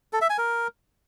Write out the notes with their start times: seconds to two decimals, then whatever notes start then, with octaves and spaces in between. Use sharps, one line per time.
0.13 A4
0.21 E5
0.30 G#5
0.38 A#4